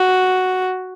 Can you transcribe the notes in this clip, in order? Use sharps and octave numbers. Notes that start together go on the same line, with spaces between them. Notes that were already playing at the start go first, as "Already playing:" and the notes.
Already playing: F#4